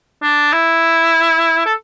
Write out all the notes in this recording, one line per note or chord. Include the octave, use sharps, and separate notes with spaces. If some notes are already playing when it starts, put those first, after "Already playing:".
D4
E4
A4